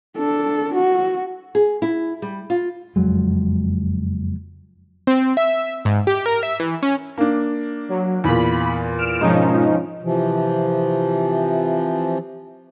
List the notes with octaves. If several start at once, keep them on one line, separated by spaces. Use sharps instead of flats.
D4 A4
F#4
G#4
E4
G3
F4
F#1 F2 F#3 G#3
C4
E5
G#2
G4
A#4
E5
E3
C#4
A#3 D4
F#3
E2 A#2 B5
F6 D7 E7
E1 G#2 F3 G#3 C#4 D#4
C3 E3 F3